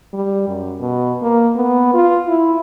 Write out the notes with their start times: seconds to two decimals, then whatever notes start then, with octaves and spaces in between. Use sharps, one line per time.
0.14 G3
0.48 F#2
0.80 B2
1.22 A#3
1.56 B3
1.94 F4
2.28 E4